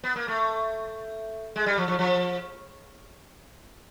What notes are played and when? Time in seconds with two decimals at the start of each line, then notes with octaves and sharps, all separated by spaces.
0.04 B3
0.16 A#3
0.28 A3
1.56 G#3
1.66 G3
1.78 F3
1.88 F3
1.99 F3